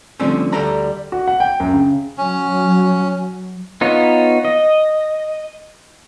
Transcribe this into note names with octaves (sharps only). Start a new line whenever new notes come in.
D3 F3 G3 A3 C4 C#4
D2 G3 A4 D5 A#5 B5
F#4
F#5
G5
F#2
C#3
F#3 C#4
B3 D#4 F4 C#5
D#5